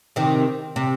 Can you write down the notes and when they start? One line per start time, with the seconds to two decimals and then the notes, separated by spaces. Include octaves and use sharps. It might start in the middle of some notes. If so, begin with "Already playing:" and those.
0.16 C3 D#3
0.76 C3